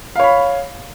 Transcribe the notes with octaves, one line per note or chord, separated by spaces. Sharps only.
C#5 F5 B5